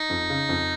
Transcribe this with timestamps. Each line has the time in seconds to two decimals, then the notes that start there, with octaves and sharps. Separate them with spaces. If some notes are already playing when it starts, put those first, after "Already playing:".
Already playing: D#4
0.10 F2
0.30 C#3
0.49 F2